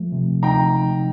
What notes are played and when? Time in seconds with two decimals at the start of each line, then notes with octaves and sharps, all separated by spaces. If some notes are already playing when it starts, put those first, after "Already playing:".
Already playing: F3 A3
0.12 C3
0.43 D#4 G5 A#5